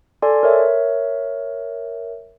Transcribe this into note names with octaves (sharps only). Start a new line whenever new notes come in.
A4 D5 G#5 C6
A#4 C#5 E5